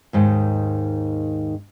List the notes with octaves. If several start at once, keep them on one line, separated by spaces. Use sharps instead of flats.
D#2 G#2 D#3